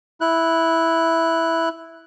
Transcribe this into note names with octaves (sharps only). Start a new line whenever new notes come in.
E4 F#6